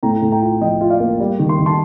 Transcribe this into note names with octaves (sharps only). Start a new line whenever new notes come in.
A2 G5 A#5
A2
G5 A#5
F4
F3 D#5 G5
F4
D5 F5
A#3
G3
D#3
C6
D#3
A5 C6